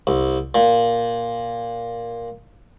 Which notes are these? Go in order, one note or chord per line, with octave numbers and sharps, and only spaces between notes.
C2
A#2